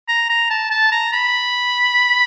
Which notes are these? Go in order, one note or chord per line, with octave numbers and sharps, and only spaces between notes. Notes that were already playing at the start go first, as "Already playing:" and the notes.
A#5
A#5
A5
A5
A#5
B5